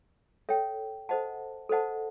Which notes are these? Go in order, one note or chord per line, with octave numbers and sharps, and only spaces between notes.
A4 C#5 E5 G5
A4 C5 D#5 F#5 A5
A4 C5 D#5 F#5 A5